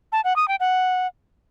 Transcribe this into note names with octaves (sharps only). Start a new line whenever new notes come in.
A5
F#5
D#6
G5
F#5